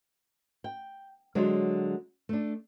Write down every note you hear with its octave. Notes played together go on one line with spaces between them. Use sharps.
G5
D3 F#3 G#3 F4 C#5
A3 D4